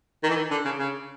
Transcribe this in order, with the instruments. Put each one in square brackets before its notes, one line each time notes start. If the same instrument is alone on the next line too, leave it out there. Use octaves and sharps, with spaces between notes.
[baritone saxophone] D#3
E3
D#3
D3
C#3
C#3